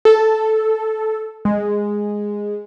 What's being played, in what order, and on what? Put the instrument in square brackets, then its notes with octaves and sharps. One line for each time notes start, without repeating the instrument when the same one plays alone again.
[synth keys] A4
G#3